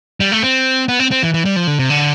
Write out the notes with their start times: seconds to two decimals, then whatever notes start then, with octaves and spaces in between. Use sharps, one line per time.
0.20 G3
0.32 A3
0.43 C4
0.88 B3
0.99 C4
1.11 C4
1.23 E3
1.34 E3
1.45 G3
1.56 F3
1.67 D3
1.79 C3
1.90 D3